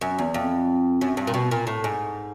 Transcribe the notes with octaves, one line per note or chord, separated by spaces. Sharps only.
F#2
E2
F2
F#2
G2
A#2
B2
A#2
A2
G#2